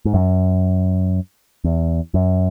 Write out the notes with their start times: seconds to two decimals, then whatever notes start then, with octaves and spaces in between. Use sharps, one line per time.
0.05 G#2
0.14 F#2
1.64 E2
2.14 F#2